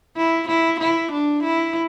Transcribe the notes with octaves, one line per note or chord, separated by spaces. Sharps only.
E4
E4
E4
D4
E4